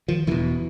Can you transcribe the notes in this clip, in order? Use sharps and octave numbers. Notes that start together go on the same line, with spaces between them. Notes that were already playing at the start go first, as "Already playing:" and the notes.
D#3 F3
E1 E2 B2 D3 E3